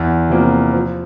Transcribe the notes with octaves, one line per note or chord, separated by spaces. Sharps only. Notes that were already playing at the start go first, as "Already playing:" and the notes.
Already playing: E2
C3 F3 A#3
F3